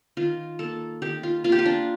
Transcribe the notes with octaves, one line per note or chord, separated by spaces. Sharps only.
D#3 F4
A#3 A4
D#3 G4
F4
A#3 F4
G4
F4
D4